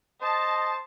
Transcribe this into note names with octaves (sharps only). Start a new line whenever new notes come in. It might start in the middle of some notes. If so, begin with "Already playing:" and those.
C5 D#5 A5